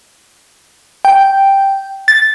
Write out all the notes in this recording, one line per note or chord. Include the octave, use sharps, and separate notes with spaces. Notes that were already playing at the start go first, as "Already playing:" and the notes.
G5
A6